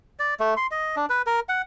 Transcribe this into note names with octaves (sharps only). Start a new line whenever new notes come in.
D5
A3
C6
D#5
D4
B4
A#4
F#5